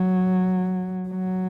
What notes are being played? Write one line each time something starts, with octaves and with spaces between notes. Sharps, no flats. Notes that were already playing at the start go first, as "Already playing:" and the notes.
Already playing: F#3
F#3